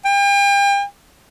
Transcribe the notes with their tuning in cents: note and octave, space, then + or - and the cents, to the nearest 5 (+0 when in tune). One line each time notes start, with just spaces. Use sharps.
G5 +40